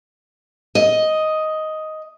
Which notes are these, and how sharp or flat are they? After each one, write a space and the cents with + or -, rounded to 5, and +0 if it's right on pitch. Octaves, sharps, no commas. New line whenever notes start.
D#5 +5